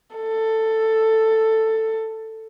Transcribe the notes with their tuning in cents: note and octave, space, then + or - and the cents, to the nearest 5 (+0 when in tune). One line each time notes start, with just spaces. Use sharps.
A4 +10